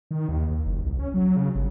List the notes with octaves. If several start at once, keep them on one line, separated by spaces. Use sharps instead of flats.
D#3
D#2
D#2
F#1
C2
C#4
F#3
C#3
G1